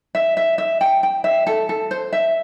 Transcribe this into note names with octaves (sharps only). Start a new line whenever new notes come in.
E5
E5
E5
G5
G5
E5
A4
A4
C5
E5